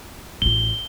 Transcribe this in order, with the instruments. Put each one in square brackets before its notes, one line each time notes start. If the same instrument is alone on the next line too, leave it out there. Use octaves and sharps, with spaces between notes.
[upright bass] A1 F4 [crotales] G7